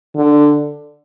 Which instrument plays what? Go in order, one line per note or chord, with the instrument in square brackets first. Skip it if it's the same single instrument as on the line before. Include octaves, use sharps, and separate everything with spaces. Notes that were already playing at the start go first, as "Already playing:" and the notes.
[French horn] D3